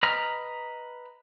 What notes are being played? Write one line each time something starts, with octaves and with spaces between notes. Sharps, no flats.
B4 D#5 A#5 F6